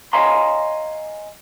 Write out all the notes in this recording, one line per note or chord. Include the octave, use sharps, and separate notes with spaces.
C#5 D#5 F5 G#5 A#5 C6